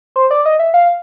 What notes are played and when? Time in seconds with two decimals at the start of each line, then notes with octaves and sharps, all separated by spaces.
0.16 C5
0.31 D5
0.46 D#5
0.59 E5
0.74 F5